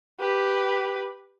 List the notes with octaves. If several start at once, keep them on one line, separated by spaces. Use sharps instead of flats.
G4 B4